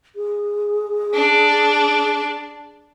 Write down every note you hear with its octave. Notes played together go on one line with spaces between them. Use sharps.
G#4
D4